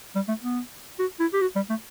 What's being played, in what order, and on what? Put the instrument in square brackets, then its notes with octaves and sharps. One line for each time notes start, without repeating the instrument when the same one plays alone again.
[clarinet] G3
A3
B3
F#4
E4
G4
F#4
G3
A3